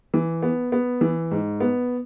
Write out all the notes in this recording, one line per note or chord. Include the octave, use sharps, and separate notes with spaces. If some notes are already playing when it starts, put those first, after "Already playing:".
E3
B3
B3
E3
G#2
B3